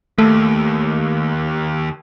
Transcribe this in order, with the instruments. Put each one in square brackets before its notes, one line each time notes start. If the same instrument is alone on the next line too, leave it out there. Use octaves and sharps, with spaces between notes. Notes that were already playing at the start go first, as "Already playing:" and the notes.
[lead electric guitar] D#2 [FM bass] A3